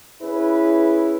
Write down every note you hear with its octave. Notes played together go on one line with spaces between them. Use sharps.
C#4 E4 G#4 B4